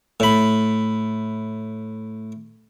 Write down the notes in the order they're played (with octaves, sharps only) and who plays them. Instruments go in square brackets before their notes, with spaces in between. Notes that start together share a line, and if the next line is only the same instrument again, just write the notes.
[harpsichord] A2 B5